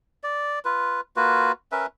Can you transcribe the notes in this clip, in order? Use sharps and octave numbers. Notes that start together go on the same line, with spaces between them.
D5
F4 B4
A#3 F4 F#4 B4
C#4 A#4 B4 E5